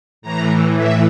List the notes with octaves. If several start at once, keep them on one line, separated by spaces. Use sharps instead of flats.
A2 E3 A#5
E5